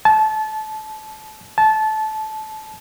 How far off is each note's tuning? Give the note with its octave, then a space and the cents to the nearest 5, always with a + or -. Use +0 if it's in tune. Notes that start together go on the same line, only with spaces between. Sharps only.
A5 -25
A5 -20